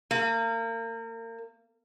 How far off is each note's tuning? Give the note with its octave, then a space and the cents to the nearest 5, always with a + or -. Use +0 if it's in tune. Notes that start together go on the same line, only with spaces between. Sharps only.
A#3 -35